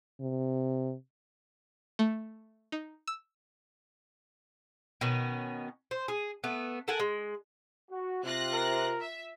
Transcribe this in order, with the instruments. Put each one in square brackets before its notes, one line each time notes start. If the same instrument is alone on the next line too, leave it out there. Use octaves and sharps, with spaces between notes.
[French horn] C3
[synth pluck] A3
D#4
E6
[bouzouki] B2 D#3 C#4
C5
G#4
A3 B3
A4 A#4 F#5 G#5
G#3
[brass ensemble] F#4
[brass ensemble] C3 [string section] F4 F#6 A#6
[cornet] A#4
[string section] E5